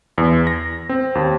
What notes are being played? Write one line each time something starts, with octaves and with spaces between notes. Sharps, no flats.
E2
A#6
C4
D#2